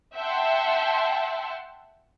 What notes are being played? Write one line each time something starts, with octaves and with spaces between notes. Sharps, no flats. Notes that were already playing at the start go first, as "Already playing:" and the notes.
E5 F#5 G5 A5 C6